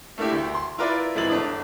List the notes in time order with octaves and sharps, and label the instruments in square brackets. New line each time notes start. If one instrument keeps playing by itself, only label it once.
[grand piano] A3 A#3 D4 E4 G4
D2
C6
E4 F4 A#4 B4 D5 E5
G#1 E3 G#3 E4 A6 F#7
G1 D4 D#6